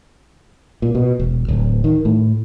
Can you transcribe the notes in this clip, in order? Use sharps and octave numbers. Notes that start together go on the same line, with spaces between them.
A#2
B2
E1
D1
D#3
A2